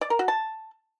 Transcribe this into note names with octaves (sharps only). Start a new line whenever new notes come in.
D5
A#4
F#4
A5